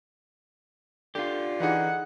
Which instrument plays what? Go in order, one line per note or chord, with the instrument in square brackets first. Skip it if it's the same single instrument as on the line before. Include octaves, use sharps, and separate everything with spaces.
[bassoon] D3 [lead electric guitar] F4 G4
[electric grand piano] E3 D#4 G#4 [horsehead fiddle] F#5